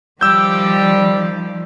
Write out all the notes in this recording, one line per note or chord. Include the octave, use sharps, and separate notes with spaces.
D#3 F3 G3 G4 D5 E6 G6